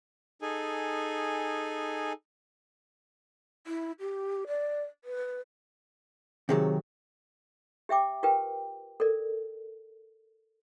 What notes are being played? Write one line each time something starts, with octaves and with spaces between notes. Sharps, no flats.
D#4 G#4 A4 G#5
E4
G4
D5
B4
C3 D#3 F#3 C4 G#4 C#5
G4 E5 G5 D6
F4 G4 A#4 B4 G5
A4 A#4 D5